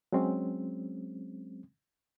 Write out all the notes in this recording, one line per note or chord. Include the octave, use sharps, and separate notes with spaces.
F#3 G#3 C4 C#4